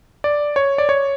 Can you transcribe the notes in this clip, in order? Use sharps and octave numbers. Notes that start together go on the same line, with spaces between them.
D5
C#5
D5
C#5